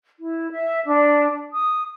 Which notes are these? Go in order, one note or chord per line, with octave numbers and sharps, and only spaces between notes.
E4
E5
D4
D#6